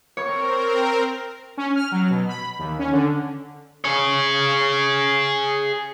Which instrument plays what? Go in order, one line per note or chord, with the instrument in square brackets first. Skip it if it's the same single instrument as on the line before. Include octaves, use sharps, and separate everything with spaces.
[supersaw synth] C4 A#4 [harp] C#5 C#6
[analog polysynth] C#4
F6
F#3
B2
B5
D#2
C#4
D3
[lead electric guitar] G#4 C#5